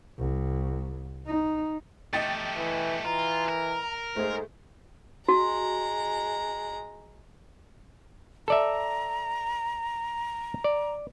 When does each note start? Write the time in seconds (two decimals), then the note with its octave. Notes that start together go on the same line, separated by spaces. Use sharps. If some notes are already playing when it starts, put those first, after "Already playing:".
0.18 C2
1.27 D#4
2.13 A3 G4 D#5 G5 A6
2.57 E3
3.05 E3 F4 A#5
3.49 A#4
4.16 G#2 A3 G#4 C5
5.28 G#3 F#4 A#5
8.48 A4 D5 E5 A#5
10.64 D5